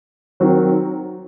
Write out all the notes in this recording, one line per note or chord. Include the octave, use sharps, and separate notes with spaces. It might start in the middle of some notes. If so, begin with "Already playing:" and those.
D#3 F#3 C4 F#4